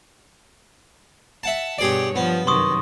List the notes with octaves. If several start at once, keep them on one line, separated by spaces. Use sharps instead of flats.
E5 F#5 A5
G2 B2 G4 G#4 C#5 D5
F3 B3
F#2 C3 D#3 C6 C#6 D#6